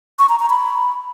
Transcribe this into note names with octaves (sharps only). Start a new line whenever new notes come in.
C#6
A#5
A#5
B5